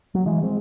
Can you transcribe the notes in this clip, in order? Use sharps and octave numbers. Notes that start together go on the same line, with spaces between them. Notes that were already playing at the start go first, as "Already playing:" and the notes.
F#3
E3 G#3
G#3 C4